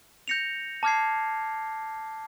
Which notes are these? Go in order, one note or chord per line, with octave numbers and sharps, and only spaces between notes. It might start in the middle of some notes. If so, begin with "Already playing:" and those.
G6 A#6 C#7 F7
A5 D6 F6 G#6 C7